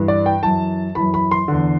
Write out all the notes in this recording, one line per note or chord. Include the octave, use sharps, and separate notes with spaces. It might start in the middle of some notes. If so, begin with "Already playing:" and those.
Already playing: G2 E3
D5
G5
F#2 E3 A5
F#2 E3 B5
B5
C6
E2 D3